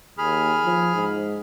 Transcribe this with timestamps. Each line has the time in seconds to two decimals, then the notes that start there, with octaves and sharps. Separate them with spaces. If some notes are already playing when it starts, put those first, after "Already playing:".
0.18 D#2 G#4 B5 F6
0.65 F3
0.95 G#2